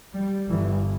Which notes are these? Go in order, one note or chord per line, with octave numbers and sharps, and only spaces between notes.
G3
G1 G2 E3